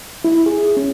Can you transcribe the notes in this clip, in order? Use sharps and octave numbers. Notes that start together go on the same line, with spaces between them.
E4
G#4
C#4